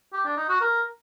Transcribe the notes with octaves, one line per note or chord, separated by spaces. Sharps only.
G4
D4
D#4
F#4
A#4